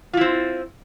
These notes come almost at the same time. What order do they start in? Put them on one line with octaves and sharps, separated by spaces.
F4 E4 C4